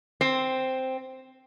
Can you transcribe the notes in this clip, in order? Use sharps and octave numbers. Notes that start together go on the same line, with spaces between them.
C4